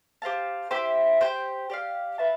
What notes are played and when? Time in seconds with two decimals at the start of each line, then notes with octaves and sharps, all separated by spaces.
0.22 G4 C5 F5 A5
0.71 E4 G4 C5 E5
1.21 G4 C5 G5
1.70 G4 D5 F5
2.18 F4 B4 E5 A5